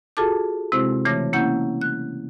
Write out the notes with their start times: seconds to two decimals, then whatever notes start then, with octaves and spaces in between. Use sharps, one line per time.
0.17 F4 F#4 G#4 A4 A5 D6
0.72 C3 G#3 C4 E4 F#4 C5
1.05 C#3 E3 A3 C#5 D6 A#6
1.33 A#3 C#4 E4 F#5 G6
1.81 F#6